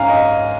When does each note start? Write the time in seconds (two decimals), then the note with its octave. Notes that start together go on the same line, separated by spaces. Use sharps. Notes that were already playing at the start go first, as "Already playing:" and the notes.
Already playing: G#2 C#4 F5 G#5 A#5
0.09 D#5